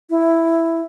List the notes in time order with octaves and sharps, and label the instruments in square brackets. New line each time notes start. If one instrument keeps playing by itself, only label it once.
[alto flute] E4